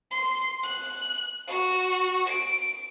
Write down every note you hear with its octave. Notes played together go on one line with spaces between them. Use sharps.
C6
F#6
F#4
D7